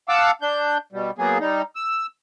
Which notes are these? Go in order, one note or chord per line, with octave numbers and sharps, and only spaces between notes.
F5 F#5 A5 D6 E6
D4 G6
B2 G3
F#3 A#3 B3 G#4
G3 D#4
E6